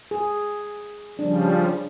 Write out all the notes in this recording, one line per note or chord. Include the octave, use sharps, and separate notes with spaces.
G#4
C#3 F3 G3 D4